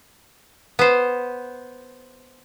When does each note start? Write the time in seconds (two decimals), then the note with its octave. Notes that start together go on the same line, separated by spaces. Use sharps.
0.79 B3 C5